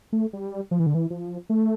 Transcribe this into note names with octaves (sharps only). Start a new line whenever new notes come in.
A3
G3
F3
E3
D3
E3
F3
A3